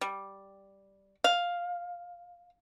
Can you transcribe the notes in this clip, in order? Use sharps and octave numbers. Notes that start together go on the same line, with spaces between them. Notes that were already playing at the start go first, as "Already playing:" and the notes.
G3
F5